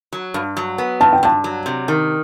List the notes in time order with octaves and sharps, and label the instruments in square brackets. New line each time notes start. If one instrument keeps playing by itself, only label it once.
[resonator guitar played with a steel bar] F#3
G2
F#3
B3
[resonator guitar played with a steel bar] G2 [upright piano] A5
[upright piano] G5
[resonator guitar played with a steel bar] G2 [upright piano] A5
[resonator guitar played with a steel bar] F#3
C3
D#3